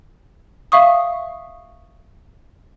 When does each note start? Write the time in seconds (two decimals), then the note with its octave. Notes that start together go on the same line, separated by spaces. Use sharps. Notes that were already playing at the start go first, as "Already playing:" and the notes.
0.72 E5 F5 C#6 D#6